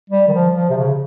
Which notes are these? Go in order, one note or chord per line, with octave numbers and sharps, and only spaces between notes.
G3
D#3
F3
F3
C3
C#3